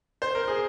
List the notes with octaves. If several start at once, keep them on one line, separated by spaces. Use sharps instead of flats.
C5
A#4
G#4